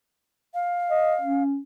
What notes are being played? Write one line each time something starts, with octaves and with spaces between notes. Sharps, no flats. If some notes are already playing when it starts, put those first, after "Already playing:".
F5
D#5
C#4